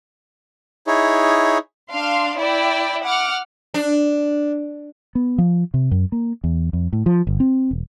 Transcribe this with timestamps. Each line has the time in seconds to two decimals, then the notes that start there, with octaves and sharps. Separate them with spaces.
0.87 D#4 E4 G#4 C#5
1.91 D4 F5 C6
2.38 E4 D5 G5
3.04 F#5 D6 F6
3.74 D4
5.15 B3
5.38 F3
5.74 C3
5.91 F#2
6.12 A#3
6.44 E2
6.73 F2
6.93 A2
7.06 F3
7.27 G1
7.40 C4
7.71 E1